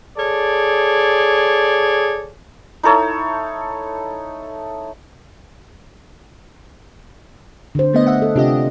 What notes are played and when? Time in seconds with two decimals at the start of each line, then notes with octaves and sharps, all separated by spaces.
0.16 G#4 A4 C#5 D5
2.83 D#4 E4 A4 C#5
7.75 D3 C5
7.93 A3 B3 D#5
8.07 E5 F#5
8.22 A4
8.36 C3 D4 F4 G4 D#5